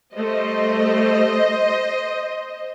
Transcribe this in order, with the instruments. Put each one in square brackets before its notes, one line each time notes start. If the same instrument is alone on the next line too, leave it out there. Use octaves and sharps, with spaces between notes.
[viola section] G3 A3 [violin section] C5 D#5